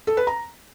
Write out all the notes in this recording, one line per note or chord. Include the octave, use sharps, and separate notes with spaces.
A4
B4
A#5